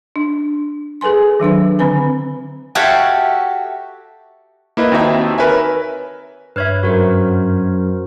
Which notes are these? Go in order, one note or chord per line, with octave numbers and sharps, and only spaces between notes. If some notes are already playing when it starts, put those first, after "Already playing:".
D4
G#4 A4 B4 G#5 C6
D#3 F#3 D4 B4
D3 C4 B4 G#5
F#4 G4 A4 C#5 E5 F5
A#3 E4 B4 D#5
D#2 C4 D#4 F#4 E5
A#4 B4 C#5 E5 G#5
G2 B4 C#5 E5 F6 G#6
F#2 F#4 A#4 C5